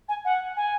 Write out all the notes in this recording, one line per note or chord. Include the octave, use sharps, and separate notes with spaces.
G#5
F#5
G#5